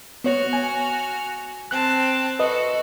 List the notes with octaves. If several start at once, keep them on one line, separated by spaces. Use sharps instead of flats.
B3 F#4 C#5 F6
G#5
C4 A5 F#6
F#4 A4 B4 D#5